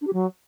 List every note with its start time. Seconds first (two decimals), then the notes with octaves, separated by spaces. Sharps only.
0.01 D4
0.07 G4
0.13 F#3